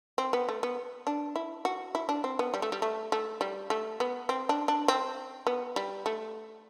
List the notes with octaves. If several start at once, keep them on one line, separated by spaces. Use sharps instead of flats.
C4
B3
A3
B3
D4
E4
F#4
E4
D4
C4
B3
G3
A3
G3
A3
A3
G3
A3
B3
C4
D4
D4
C4
B3
G3
A3